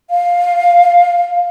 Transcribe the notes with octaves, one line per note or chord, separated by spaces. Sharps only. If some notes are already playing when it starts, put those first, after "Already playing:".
F5